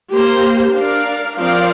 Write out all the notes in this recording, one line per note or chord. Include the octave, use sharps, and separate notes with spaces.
A#3 G4 C5
D4 A#4 D5 F5
F3 C4 A#4 D5 F5